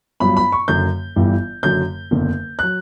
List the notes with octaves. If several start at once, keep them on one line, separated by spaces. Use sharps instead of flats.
G1 G2 F#3 B5
B5
C#6
F#1 F#2 D3 F#3 G6
G1 G2 E3 G3
F#1 F#2 D3 F#3 G6
F#1 E2 D3
F#3 F#6